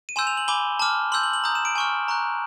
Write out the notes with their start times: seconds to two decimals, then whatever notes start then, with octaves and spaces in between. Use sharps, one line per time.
0.09 D#7
0.16 G#5 C6 E6 G6 E7
0.27 F7
0.37 F#7
0.48 G#5 B5 D6 G7
0.79 A5 D6 F6
1.12 C6 E6 G6 F#7
1.23 F#7
1.33 F#7
1.44 A#5 D#6 G6
1.55 E7
1.65 D7
1.75 G#5 C#6 F6
2.08 A#5 C#6 F#6